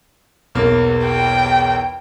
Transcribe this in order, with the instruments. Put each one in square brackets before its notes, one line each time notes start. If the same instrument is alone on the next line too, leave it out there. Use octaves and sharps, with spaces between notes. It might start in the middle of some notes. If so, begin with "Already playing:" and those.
[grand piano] B1 E2 A#3
[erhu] G5